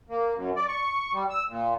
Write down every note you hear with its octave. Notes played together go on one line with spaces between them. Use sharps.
A#3
F#2
D5
C#6
G3
E6
A#2